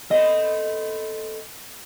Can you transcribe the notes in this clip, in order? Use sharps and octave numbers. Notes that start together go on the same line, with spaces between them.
A3 B3 C4 D#5